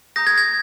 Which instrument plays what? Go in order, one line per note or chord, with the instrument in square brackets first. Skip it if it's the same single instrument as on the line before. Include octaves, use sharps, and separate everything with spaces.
[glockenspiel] A#5 D#6 G6 A#6
G#6
G#6